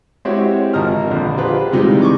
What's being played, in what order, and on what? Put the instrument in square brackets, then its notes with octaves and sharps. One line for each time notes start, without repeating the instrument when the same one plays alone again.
[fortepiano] G#3 C4 E4 F#4 G4 C#5
G#1 F3 A#4 A#5 D#6 F6
A#1 D3
F4 G4 G#4 B4 C5
C3 E3 G3 G#3 D#4 F4
C#6 D6